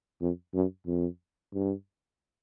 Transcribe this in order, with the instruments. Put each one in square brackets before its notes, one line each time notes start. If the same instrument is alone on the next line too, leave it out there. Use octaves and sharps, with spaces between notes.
[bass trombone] F2
F#2
F2
G2